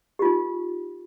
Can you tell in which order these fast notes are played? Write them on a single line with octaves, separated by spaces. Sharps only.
G4 F4 D#4